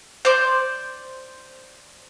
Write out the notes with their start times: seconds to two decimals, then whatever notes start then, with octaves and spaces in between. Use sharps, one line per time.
0.25 C5 D5